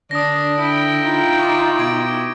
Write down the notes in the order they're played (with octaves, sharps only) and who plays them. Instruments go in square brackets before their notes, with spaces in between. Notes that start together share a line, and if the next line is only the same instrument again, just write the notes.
[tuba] D3 [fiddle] D4 [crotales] D#6 A#6
[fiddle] E4 G5
[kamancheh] D#4 F4
[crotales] C#6 D6
[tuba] B2 [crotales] D6 G#6 D7